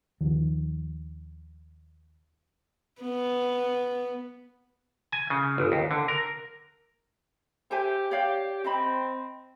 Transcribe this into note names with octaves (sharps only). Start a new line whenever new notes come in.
D#2 D#3 F3
B3
G#5
C#3
G1
D#2
D3
A#4
G4 C5 E5 G#5
G4 C#5 D5 F5
C4 C5 D#5 B5